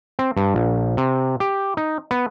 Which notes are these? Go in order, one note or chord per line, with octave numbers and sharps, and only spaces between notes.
C4
G2
A#1
C3
G4
D#4
B3